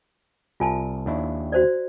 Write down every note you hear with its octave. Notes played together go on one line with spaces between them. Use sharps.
C2 F4 G#5 A5
D#2 D4 E4
F#4 C5 D5